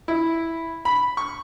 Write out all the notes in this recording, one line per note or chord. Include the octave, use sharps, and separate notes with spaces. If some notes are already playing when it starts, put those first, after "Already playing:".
E4
B5
C#6